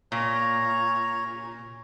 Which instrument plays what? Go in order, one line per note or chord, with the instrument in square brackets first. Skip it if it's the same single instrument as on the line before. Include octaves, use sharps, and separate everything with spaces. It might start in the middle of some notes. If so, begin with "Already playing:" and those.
[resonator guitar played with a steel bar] A#2 [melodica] C#5 A#5